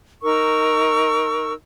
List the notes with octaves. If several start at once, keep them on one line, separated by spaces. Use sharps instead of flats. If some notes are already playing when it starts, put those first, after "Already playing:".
D#4 A#4 C#6 E6